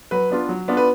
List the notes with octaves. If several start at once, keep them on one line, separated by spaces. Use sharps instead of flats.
F#3 B4
B3 D4 F4
F#3
B3 D4 F4
B4